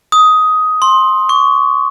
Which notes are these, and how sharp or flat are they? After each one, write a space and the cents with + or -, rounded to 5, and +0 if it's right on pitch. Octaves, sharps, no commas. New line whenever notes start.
D#6 +10
C6 +15
C#6 +30